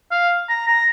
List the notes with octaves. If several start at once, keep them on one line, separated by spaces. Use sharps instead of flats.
F5
A#5
A#5